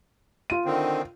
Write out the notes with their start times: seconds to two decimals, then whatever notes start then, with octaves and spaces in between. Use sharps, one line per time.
0.50 F4 D#7
0.65 D3 D#3 C4